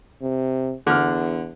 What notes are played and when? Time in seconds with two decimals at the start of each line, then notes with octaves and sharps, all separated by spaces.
0.22 C3
0.87 E2 D3 F6